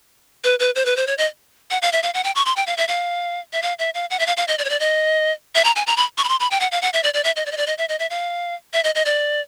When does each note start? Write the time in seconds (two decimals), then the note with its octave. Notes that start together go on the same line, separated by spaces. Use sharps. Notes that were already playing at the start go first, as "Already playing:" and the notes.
0.44 B4
0.60 B4
0.75 C5
0.85 B4
0.97 C5
1.07 C#5
1.18 D#5
1.71 F#5
1.82 F5
1.93 E5
2.03 F5
2.14 F#5
2.24 G5
2.35 C#6
2.46 C6
2.56 G5
2.67 F5
2.77 E5
2.88 F5
3.53 E5
3.62 F5
3.79 E5
3.94 F5
4.10 F#5
4.19 E5
4.27 F5
4.37 F5
4.48 D#5
4.59 D5
4.65 C#5
4.70 D5
4.80 D#5
5.55 E5
5.65 A#5
5.76 G#5
5.87 A#5
5.97 B5
6.18 C#6
6.24 B5
6.29 C6
6.40 B5
6.51 G5
6.60 F#5
6.72 F5
6.82 F#5
6.93 E5
7.04 D5
7.14 D5
7.24 E5
7.36 D#5
7.46 D5
7.52 D#5
7.57 D5
7.67 D#5
7.78 E5
7.89 D#5
7.99 E5
8.10 F5
8.73 E5
8.84 D#5
8.95 D#5
9.06 D5